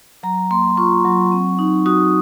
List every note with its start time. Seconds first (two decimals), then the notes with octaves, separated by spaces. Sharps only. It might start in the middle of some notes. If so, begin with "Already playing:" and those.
0.23 F#3 A#5
0.51 A#3 C6
0.77 F4 C#6
1.05 F#3
1.32 C4
1.59 D#4
1.86 F#4 D#6